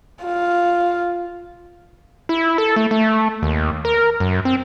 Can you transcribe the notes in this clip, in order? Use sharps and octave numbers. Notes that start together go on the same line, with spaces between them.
F4
E4
A4
A3
A3
D#2
A#4
F#2
C4